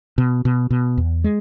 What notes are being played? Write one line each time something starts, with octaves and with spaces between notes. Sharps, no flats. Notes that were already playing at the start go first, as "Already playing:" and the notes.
B2
B2
B2
E2
G#3